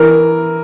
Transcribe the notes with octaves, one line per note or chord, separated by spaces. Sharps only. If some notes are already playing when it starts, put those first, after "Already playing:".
Already playing: E3 A#4